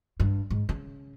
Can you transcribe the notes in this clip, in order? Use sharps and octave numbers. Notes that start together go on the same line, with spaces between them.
G2
G#2
C#3